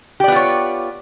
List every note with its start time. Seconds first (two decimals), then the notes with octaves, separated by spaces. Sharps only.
0.20 G4
0.24 D5
0.28 B3
0.32 F4
0.36 C#5